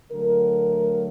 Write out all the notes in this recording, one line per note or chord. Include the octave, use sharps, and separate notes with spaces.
D3 F#3 A3 A#4